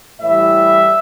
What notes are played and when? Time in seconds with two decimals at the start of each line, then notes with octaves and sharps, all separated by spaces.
0.21 A2 E3 G3 E5